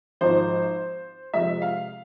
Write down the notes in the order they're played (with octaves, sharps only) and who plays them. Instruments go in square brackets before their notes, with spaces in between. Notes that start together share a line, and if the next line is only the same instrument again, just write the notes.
[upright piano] G#1 G#2 F3 C5
F2 C3 G#3 E5
F5